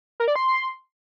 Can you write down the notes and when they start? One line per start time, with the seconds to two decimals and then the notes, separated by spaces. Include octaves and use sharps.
0.20 A#4
0.28 D5
0.36 C6